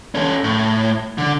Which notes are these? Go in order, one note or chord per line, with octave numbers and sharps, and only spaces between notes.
C#4 A4
A2
D3